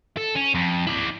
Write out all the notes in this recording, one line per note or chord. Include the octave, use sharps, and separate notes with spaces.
A4
C#4
F2
E4 D5